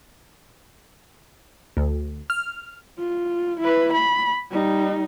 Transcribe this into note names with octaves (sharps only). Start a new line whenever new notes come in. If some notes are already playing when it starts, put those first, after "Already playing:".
D2
F6
F4
E4 B4
B5
G3 D#4